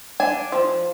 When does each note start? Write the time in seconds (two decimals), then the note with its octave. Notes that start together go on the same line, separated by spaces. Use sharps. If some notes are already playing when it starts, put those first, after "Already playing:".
0.20 D4 G#5
0.52 F3